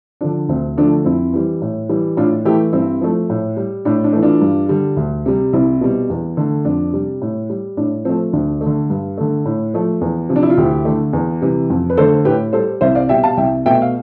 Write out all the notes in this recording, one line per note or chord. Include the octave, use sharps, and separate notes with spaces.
D3 F3 D4
D2 C4
D3 F3 A3 D4
F2 C4 E4
E3 G3
A2
E3 G3
A2 D4 F4
E3 A3 E4 G4
G2 C4 E4
F3 A3
A2
G3
A2 D4
D4
E3 A3
D4 F4
G2
D3 G3
D2
C3 G3
C2 C4 E4
B2 G3
E2
D3 A3
F2 D4
C3 G3
A2
G3
A2 D4
F3 A3 C4
D2 D4
A3
D3
G2
D3 A3
A2
F3 A3
E2
C3 F3
D4
E4
F4
D2 E4 G4
D3 A3
E2
C3 E3 G3
F2
B4
D3 A3 A4 C5
A2 G4 B4
G3 A4 C5
C2 C5 E5
D5 F5
B2 G3 E5 G5
F5 A5
C2 E5 G5
B2 A3 E5 G5
F5